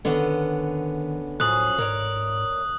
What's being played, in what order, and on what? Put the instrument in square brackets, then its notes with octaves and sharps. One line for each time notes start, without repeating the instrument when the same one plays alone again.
[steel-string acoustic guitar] D3 B3 C#4 [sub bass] D#3
[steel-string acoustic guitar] F#2 F3 C#4 [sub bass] A2 [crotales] D#6 F#6
[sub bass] G#2 [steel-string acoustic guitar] A#4 C#5 D5